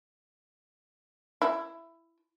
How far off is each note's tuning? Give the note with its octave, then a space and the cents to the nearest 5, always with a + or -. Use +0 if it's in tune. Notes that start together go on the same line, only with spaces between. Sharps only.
E4 +10